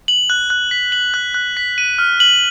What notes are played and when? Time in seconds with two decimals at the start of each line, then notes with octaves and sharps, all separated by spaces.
0.08 F#7
0.30 F#6
0.50 F#6
0.71 B6
0.92 F#7
1.14 F#6
1.34 F#6
1.57 B6
1.78 D#7
1.98 F6
2.20 F#7